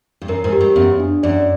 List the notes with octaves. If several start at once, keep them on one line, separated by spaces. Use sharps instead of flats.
G2
F#2 A#4
G#2
G4
G2
F#2 B3
D4
F#2 D5